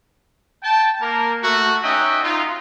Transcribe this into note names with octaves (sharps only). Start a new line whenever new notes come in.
G5 A5
A#3 A#4
A3 F#4
C#4 D#4 F#4 D#5 E5 G5
D#4 F4